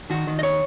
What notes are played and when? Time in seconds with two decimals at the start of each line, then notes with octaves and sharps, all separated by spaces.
0.10 D#3 F#4
0.27 D#3
0.39 D#5
0.43 C#5